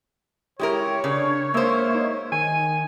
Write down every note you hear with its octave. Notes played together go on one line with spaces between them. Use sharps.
G#3 E4 G4 A#4 C#5
C#3 D4
G#3 A#3 C5 E5
D#4
D#3 G#5